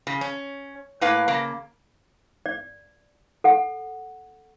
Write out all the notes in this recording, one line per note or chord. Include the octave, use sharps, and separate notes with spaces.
C#3
C#4
A2 A#3 B4 F5
C#3 A#3
D5
A4 F#5